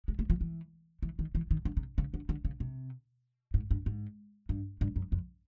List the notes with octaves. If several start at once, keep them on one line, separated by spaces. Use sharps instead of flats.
G#3
A3
F3
E3
E3
D#3
E3
D#3
D3
C3
C#3
D3
D3
C#3
C3
G#2
G2
G#2
G2
G2
F#2
F2